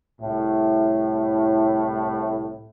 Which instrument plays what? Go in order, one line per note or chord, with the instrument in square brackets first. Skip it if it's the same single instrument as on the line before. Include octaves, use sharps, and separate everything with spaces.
[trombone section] C2 A2